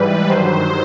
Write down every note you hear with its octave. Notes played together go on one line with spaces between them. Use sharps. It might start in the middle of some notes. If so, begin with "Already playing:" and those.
Already playing: G#2 E3 G3 B4
G2 D#3 F#3 C5